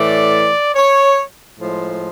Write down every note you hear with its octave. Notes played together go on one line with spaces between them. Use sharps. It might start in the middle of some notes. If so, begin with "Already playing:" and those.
Already playing: A2 E3 A3 D5
C#5
A2 F3 G#3